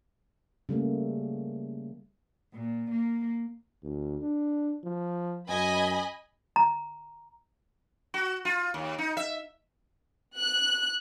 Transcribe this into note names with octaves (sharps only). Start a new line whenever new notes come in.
C#3 G3 A3 A#3
A#2
A#3
D2
D4
F3
F#2 D#5 G#5 B5
A#5
F#4
F4
D#2
D#4
E5
F#6